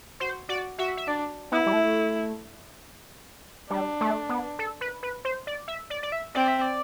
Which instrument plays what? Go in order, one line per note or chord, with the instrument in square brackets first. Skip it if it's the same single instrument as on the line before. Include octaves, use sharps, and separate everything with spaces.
[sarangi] F#4 [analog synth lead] C5
[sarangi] F#4 [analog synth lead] D5
[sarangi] F#4 [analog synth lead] E5
[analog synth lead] E5
[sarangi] D4 [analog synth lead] D5
[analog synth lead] B3 [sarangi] E4
[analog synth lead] G3
A3
[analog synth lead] G3 [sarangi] D4
[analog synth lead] A3
B3
A4
B4
B4
C5
D5
E5
D5
D5
E5
[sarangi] C4 [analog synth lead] D5
[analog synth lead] E5
D5